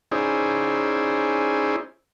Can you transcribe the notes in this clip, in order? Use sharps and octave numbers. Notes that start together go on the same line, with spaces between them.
C#4 D#4 E4 G#4 C5 D5